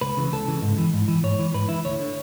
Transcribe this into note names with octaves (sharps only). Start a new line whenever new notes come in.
C#2 B4
C#3 E3
C#2 A4
C#3 E3
G#2
E3
G#2
E3
G#2 C#5
E3
G#2 B4
E3 E4
D2 C#5
D3